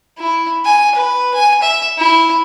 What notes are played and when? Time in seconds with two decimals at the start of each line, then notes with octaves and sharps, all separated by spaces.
0.18 E4
0.65 G#5
0.95 B4
1.34 G#5
1.62 E5
1.98 E4